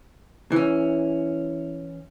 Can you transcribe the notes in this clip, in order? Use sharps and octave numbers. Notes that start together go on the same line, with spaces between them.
E3 C#4